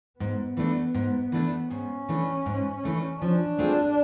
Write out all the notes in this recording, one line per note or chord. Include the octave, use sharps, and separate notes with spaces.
G#2 B3
E3 A3 D4
G#2
E3 A3 D4
G#2 C#4
E3 A3 D4
G#2
E3 A3 D4
F3 D4
A3 C4 F4 G#4